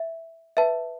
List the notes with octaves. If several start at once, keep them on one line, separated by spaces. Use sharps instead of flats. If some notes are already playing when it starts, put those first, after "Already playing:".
Already playing: E5
B4 E5 A5